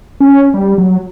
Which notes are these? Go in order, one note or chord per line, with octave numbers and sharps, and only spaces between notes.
C#4
G3
F#3